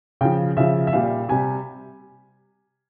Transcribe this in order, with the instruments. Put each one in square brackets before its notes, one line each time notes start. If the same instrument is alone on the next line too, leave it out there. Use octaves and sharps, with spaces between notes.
[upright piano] C#3 F3 G5
C#3 F3 E5
E5
A#2 G3 F5
C3 G3 G#5